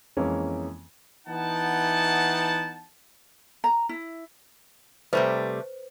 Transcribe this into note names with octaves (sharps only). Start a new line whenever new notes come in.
F2 E3 G#3 A#3 C#4
E3 B3 D#4 F#5 G5 A5
A#5
E4
C3 G3 A3 B4 C5